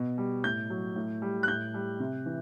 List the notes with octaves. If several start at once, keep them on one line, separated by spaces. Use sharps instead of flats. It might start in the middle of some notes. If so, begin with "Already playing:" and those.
Already playing: B2
G3
A2 G6
F#3
A2
G3
F#6
A2 G6
G3
C3
E3